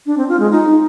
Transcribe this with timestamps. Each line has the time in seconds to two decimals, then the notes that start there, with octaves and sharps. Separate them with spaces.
0.06 D4
0.18 C4
0.29 F4
0.40 G#3
0.51 D#4